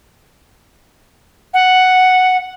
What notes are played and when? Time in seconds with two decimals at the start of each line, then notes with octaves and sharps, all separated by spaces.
1.54 F#5